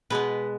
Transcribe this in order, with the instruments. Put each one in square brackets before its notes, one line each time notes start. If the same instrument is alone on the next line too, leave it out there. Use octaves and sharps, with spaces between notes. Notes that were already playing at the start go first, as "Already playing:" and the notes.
[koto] B2 G#3 B3 B4